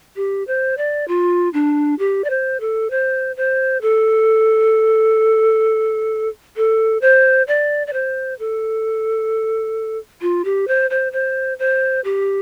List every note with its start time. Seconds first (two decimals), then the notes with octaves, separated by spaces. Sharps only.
0.16 G4
0.47 C5
0.78 D5
1.08 F4
1.54 D4
1.99 G4
2.24 D5
2.30 C5
2.60 A4
2.91 C5
3.37 C5
3.82 A4
6.57 A4
7.02 C5
7.48 D5
7.87 D5
7.93 C5
8.39 A4
10.22 F4
10.45 G4
10.68 C5
10.90 C5
11.12 C5
11.59 C5
12.04 G4